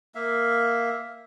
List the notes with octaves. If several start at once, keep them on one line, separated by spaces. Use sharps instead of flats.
A#3 E5 F5